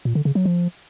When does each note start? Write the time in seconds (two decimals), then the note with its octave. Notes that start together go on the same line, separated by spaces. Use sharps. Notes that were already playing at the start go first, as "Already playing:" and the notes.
0.05 A#2
0.15 D3
0.25 C#3
0.35 F#3
0.45 F3